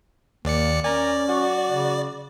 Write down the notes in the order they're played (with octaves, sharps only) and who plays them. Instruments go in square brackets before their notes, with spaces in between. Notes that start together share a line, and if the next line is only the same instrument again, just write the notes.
[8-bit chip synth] D#2 D5 C#7 [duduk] A#3
[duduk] C#4 [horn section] A#4 G#5 A#5 [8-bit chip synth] D5
[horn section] F#3 F#4
[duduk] C#3